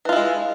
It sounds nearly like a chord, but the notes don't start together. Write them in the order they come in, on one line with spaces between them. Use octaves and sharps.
E3 F4 E4 G#3